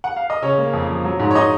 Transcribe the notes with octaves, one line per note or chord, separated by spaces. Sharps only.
F#5
F5
D#5
C#3 C#4 C#5
A#3
F2
F3
F#3
G#2
C#5
D#4 D#5